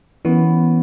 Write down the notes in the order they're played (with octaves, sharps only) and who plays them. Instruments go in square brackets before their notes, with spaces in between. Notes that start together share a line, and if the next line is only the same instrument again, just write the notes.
[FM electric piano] E3 [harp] B3 C#4